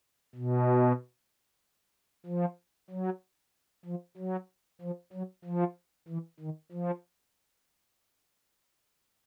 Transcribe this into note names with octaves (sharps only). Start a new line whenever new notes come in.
B2
F3
F#3
F3
F#3
F3
F#3
F3
E3
D#3
F3